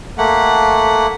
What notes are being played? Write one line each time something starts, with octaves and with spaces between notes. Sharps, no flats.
A3 A#3 F#5